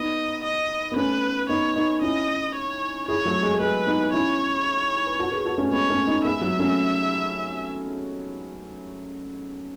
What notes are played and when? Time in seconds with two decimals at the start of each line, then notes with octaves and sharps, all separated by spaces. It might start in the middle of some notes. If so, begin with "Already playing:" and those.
Already playing: B3 D#4 D#5
0.44 D#5
0.92 B3
0.96 A3 C#4 B4
1.49 B3 D#4 C#5
1.76 B3 D#4
2.02 C#4 E4 D#5
2.55 C#5
3.08 E4 G#4 C#5
3.25 F#3 A3
3.43 G#3
3.53 A3
3.60 G#3 B4
3.86 B3 D#4
4.13 C#4 E4 C#5
5.07 B4
5.19 F#4 A4
5.32 G#4 B4
5.45 F#4 A4
5.58 A3 C#4
5.71 G#3 B3 C#5
5.90 A3 C#4
6.06 B3 D#4
6.25 G#3 B3 E5
6.41 F#3
6.59 A3 C#4